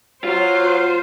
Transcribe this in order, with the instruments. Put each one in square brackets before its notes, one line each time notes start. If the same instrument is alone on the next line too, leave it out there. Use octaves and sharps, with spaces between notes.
[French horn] F#3 [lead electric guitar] F4 [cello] C5